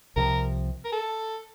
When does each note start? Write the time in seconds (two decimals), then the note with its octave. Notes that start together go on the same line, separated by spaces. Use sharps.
0.16 C2 C3 F3 A#4
0.85 A#4
0.92 A4